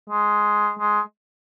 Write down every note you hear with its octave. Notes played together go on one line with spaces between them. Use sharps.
G#3
G#3